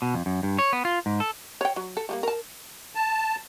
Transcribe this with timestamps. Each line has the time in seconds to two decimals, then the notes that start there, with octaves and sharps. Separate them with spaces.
0.02 B2
0.14 F2
0.26 F#2
0.43 G2
0.59 C#5
0.73 B3
0.85 F4
1.06 G#2
1.20 A4
1.61 C#5 G5
1.76 F#3
1.97 A4
2.09 G3 A3 A#3
2.23 A#4 A5
2.95 A5